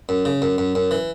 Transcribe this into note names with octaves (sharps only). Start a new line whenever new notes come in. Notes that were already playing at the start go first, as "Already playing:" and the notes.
F#2
C#3
F#2
F#2
F#2
E3